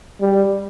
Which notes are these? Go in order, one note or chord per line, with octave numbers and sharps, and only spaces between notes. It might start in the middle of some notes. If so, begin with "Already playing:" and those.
G3